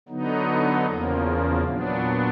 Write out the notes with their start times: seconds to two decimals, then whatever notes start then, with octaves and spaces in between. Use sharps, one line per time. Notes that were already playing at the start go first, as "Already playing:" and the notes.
0.09 D3 F#3 B3 D#4
0.86 E2 C#3 F3 A#3
1.64 A#2 F#3 B3 D4